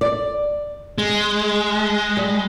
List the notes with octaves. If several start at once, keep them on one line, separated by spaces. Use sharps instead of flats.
D5
G#3
G3